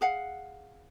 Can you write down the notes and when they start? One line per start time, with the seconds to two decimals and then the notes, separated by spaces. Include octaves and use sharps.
0.01 G#4 F5 F#5